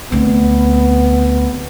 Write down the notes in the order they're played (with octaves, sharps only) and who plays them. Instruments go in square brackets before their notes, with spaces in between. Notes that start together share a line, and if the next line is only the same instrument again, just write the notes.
[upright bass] D2 C4 [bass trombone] B3